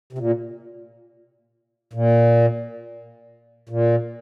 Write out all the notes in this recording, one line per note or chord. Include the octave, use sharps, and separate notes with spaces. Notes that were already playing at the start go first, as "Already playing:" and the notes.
C3
A#2
A#2
A#2